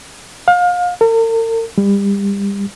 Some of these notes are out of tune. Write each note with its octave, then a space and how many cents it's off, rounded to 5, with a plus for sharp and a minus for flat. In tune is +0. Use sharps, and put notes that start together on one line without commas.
F5 +30
A#4 -45
G3 +30